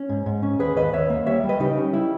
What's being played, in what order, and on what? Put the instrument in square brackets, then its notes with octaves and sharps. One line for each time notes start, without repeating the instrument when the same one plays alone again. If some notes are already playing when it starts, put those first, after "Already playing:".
Already playing: [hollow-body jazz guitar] C#4
G#2
G#2
C#4
D#2 G#4 B4
D#2 B4 D#5
D#2 C#5 E5
A#3
G3 C#5 E5
G3
B4 D#5
C#3 D#4 G4
C#4
G3 E4